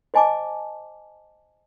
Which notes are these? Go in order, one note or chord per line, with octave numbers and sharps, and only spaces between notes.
C5 D#5 G#5 A5 D6